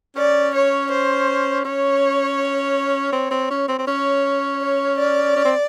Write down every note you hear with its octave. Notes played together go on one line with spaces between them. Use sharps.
C#4 D5
C#5
C5
C#4 C#5
C4
C4
C#4
C4
C4
C#4 C#5
C#5
D5
C#4
C4